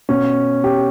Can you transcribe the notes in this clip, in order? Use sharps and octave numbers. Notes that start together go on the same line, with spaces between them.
B2 C#4
G4